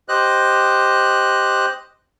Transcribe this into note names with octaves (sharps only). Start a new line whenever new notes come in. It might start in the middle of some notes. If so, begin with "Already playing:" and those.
G4 C5 D#5 F#6